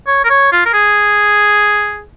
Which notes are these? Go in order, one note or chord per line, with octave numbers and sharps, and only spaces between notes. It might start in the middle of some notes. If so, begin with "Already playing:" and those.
C#5
A#4
C#5
F4
A#4
G#4